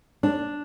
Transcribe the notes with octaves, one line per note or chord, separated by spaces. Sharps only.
D4